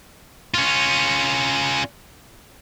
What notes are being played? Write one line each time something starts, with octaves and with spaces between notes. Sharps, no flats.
C#4 F4